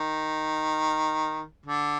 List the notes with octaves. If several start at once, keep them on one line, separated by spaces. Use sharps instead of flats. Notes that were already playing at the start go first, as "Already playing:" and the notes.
Already playing: D#3
D3